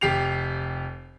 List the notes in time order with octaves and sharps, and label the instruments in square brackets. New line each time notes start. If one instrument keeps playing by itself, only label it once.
[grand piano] F1 G4 C7 F7